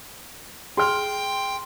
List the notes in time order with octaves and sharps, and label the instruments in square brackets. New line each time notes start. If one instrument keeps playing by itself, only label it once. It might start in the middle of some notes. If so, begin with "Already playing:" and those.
[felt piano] G#4 F6 [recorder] G5 [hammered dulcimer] C6